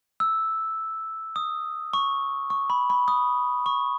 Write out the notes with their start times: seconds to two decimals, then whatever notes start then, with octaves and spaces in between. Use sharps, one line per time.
0.20 E6
1.36 D#6
1.93 C#6
2.50 C#6
2.70 B5
2.90 B5
3.08 D#6
3.66 C#6